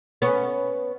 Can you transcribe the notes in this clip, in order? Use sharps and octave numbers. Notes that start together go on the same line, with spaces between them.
B3 C#4